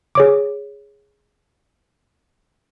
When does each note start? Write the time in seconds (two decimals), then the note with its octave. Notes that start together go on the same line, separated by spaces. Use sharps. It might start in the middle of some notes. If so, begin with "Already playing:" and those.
0.15 G#4 C#5 D6